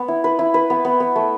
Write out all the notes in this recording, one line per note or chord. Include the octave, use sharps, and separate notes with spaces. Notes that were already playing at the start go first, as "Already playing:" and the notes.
Already playing: B3
E4
B4
E4
B4
B3
B3
B3
A3